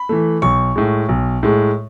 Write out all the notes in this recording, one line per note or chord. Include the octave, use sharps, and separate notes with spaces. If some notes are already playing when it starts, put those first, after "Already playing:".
Already playing: B5
E3 A3
B1 C#6
A2 G#3
B1
A2 G#3